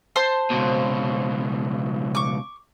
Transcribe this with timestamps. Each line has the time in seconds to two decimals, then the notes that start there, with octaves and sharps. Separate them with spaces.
0.16 C5 A5 C6
0.51 C#2 B2
2.15 C#6 D6